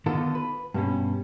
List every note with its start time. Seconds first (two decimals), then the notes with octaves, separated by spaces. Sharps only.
0.06 D3 D#3 B3 F4 A4
0.35 B4
0.74 G2 B2 C#4